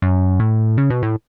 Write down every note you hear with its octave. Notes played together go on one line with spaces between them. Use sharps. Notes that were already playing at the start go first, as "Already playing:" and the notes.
F#2
A2
C#3
B2
A2